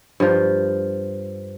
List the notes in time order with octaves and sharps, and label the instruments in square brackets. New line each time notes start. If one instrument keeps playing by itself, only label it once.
[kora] G2 F3